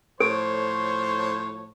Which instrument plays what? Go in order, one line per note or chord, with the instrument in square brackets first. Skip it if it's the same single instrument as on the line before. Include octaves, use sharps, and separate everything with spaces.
[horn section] A2 F3 C#5 [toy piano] A4 [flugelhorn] C5